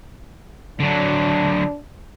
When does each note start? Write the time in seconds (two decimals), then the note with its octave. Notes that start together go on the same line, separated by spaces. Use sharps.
0.80 D3 F#3 D4